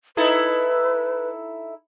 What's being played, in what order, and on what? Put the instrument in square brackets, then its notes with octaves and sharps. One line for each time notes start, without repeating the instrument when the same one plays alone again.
[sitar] D#4 E4 A4 [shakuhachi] B4